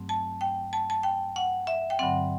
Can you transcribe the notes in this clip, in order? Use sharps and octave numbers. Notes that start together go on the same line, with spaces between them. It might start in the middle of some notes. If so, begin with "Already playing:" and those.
Already playing: G2 F#3 A3 C4
A5
G5
A5
A5
G5
F#5
E5
G5
G2 D3 F#3 C4 F#5